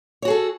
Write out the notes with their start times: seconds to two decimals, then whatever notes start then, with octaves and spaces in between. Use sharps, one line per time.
0.22 C#5
0.25 F#4
0.28 G#4
0.30 A4